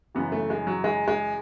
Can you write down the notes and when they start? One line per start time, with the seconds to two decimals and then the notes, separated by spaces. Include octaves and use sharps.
0.15 F#2 C#3 E3 B3
0.32 A3
0.50 G#3
0.67 F#3
0.84 G#3
1.08 G#3